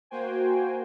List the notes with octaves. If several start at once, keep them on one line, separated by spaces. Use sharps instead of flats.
A#3 F#4 C5 G5 G#5